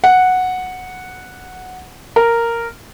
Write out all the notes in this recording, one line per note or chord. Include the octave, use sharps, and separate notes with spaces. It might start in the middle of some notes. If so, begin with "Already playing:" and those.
F#5
A#4